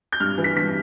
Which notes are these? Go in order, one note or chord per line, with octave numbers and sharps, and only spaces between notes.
G6
G2 F6
E3
B6
G2 B6